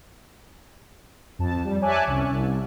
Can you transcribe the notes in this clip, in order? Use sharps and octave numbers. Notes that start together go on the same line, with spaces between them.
F2 A5
G3
C#5 E5 G#5 A5 D6 F#6
C2 C#4
C2